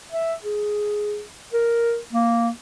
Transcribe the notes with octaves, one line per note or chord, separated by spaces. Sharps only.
E5
G#4
A#4
A#3